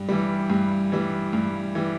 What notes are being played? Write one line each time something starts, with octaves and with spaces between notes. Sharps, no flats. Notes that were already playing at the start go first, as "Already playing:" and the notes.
Already playing: G2
E3 G3
G2
E3 G3
G2
E3 G3